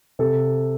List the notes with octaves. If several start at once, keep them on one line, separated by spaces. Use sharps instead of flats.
C3 A4